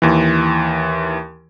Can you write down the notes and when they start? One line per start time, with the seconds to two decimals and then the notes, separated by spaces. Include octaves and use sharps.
0.02 D#2 E3